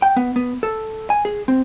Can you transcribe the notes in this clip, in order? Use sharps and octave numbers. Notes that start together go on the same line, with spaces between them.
G5
B3
B3
A4
G#5
G#4
C4